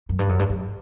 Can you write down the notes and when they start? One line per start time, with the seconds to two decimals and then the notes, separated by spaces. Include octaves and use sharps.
0.09 F#2
0.19 G2
0.29 F#2
0.39 G2
0.50 F#2